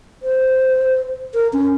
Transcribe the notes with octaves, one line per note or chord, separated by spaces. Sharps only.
C5
A#4
C#4